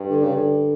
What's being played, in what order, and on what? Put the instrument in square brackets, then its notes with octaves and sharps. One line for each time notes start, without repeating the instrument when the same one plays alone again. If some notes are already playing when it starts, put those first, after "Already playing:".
Already playing: [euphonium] G2
[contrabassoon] D3
C#3
D3